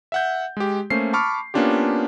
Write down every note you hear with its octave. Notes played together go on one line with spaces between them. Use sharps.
E5 F#5 G6
G#3 G4
A3 A#3 C#4 C5 C7
A5 B5 C#6 D6 F6
A#3 B3 C#4 D4 F4 G4